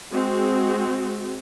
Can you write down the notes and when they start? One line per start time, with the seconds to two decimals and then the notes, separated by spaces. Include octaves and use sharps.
0.11 G#3 C4 F#4